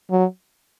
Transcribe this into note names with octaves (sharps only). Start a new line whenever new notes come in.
F#3